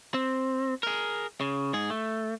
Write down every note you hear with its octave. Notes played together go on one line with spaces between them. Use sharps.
C4
G#4 A#4
C#3
G#2 G#4
A3